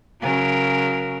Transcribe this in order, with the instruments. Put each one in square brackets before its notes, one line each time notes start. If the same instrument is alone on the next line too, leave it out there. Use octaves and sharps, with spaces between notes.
[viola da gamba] C#3 F#3 A#4